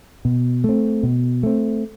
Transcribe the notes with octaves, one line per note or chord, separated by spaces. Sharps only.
B2
A3 C4
B2
A3 C4